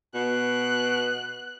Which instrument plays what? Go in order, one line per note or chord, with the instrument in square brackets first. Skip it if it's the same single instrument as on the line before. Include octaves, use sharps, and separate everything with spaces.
[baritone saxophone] B2 [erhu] F#6